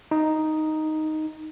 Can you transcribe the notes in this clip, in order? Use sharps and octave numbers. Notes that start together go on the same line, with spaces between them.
D#4